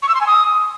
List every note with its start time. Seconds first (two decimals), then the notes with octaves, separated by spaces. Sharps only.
0.02 C#6
0.09 E6
0.15 C6
0.21 G#5
0.27 D#6